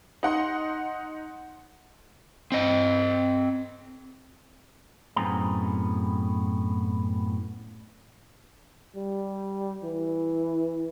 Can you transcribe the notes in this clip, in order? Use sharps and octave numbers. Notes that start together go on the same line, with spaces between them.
D#4 F#5 C6
C4 D#5
F#2 A2 B3 C4 G#4 A#5
G3
E3